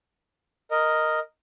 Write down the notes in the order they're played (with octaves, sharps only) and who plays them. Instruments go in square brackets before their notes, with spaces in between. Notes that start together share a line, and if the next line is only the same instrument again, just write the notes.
[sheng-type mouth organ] A#4 D#5